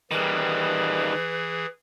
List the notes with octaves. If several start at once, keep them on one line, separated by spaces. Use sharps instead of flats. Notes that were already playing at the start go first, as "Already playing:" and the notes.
D#3 E3 G3 G#4 B4